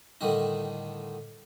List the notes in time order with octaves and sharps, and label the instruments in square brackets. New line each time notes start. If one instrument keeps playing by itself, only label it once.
[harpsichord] A2 D3 D#3 G3 D#4